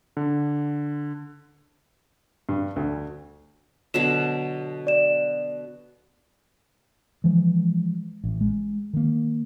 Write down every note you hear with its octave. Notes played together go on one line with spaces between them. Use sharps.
D3
G2
D2
B2 D3 F#3 E7
D5 E7
E3 F3 G#3
A1
G#3
D#3 A#3